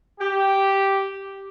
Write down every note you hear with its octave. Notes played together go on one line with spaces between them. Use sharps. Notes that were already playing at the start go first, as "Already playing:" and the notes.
G4